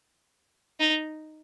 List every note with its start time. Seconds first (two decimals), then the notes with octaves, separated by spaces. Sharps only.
0.80 D#4